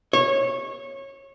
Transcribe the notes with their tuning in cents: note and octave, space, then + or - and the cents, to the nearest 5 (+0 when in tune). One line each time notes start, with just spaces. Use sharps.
C#5 -20